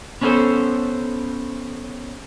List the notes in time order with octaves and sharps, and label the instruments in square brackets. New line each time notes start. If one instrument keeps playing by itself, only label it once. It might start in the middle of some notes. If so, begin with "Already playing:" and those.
[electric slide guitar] B3 C#4 D4 E4 A4 C5